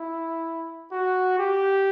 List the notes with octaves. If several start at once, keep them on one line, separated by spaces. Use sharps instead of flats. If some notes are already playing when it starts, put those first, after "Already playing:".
Already playing: E4
F#4
G4